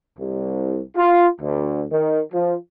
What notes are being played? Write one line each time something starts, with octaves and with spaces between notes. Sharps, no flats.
C2
F4
D2
D#3
F3